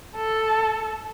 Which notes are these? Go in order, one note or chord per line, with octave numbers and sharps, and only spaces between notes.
A4